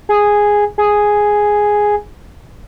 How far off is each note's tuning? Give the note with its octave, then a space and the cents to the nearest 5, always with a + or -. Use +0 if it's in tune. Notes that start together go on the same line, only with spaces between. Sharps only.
G#4 -5
G#4 +0